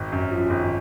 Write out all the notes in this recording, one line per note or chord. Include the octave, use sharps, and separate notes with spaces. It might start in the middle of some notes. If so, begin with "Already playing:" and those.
Already playing: G#1
F#2
F3
G#1